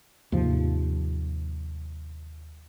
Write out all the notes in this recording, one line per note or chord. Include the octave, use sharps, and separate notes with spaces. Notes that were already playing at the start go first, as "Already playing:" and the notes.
D#2 G#2 C3 F3